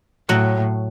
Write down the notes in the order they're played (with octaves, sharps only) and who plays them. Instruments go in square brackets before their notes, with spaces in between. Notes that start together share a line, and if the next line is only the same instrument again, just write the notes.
[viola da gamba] A2 [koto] F#3 F#4